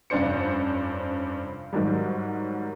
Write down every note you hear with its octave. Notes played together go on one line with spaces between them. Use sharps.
F1 G2 C#4 D4 C5 C#7
G#2 D#3 F#3 G3